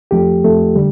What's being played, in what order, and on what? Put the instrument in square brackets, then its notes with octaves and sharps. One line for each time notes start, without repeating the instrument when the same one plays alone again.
[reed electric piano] F2 F3 A3 G4
F2 F3 A3
D3 G3